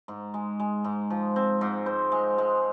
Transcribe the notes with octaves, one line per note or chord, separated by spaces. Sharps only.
G#2
G#3
G#3
G#2
F3
C4
G#2
C5
G#3
G#3